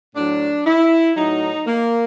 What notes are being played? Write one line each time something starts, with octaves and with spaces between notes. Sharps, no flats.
A2 F#3 D4
E4
A2 F#3 D#4
A#3